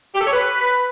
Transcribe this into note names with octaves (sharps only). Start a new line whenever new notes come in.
G4
A4
C#5
B4